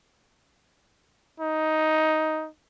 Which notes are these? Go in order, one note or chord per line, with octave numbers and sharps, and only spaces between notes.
D#4